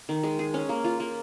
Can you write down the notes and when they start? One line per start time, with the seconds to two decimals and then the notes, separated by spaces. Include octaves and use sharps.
0.09 D#3
0.23 G#3
0.39 G#4
0.54 C#4
0.69 A#3
0.84 F4
1.00 A#3